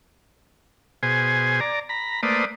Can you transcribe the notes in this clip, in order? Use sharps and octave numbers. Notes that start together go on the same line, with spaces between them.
B2 G#4 C5 G#5
D5 A#5
A#5 B5
A3 A#3 B4 C5 D5 D#6